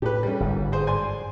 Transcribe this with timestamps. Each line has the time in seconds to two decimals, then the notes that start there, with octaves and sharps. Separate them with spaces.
0.02 A2 G4 B4
0.23 G3 C#4
0.40 G1 G#2
0.72 G#4 C5
0.87 D5 G#5 C6